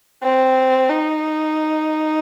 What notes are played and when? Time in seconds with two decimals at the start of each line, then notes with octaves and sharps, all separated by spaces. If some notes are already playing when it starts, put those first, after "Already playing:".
0.23 C4
0.89 D#4